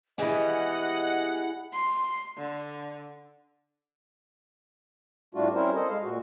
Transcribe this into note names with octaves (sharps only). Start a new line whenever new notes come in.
B2 E3 G3 E4 G#4 D#5 F#5
C6
D3
A2 G3 A3 D4 F4 F#4
G3 C4 C#4 E4 A#4 C5
A4 C5 D#5
G#3 F5
A#2 F#4